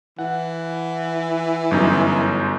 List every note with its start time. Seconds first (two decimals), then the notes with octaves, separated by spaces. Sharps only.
0.19 E3 F#5
1.71 G1 F#2 D#4